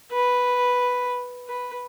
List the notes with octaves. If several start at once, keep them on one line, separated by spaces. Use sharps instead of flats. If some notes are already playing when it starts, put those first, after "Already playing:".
B4
B4